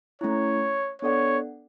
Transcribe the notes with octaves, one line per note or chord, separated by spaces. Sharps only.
A3 C#4 E4 C#5
B3 D4 A4 C#5 D5 F#5